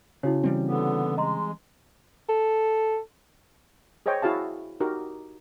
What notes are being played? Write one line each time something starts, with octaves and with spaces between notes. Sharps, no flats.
C#3 E4 F#4 C#5
E3 G3 C4
D3 B3
G#3 D#5 A#5 C6
A4
G#4 C5 C#5 D#5 G5
E4 F#4 G#4 F5 A5
D#4 F#4 G4 A#4